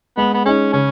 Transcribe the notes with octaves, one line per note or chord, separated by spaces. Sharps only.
G#3 B3
B3
C#4 D#4 G#4
C#3 C#4